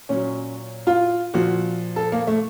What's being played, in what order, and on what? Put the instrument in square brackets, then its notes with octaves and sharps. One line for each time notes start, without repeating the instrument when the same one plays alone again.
[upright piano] A#2 F#3 C#4
F4
A#2 F3 F#4
A4
A#3
A3